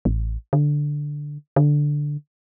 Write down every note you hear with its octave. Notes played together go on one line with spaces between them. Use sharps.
A1
D3
D3